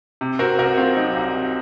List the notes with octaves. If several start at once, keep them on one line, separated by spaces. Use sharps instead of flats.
C3
C4 F#4 A#4
C2 F#4 A#4
C4 F4
F#3 D#4
C2
C3